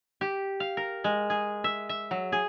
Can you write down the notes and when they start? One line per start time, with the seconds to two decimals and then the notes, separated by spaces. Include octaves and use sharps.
0.21 G4
0.60 F5
0.77 A#4
1.04 G#3
1.30 G#4
1.64 E5
1.89 E5
2.11 F#3
2.32 G#4